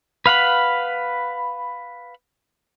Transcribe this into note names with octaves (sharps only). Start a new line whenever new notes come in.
B4 F5 F#5 B5